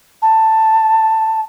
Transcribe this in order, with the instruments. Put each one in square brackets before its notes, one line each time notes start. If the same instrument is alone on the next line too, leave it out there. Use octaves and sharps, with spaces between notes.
[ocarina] A5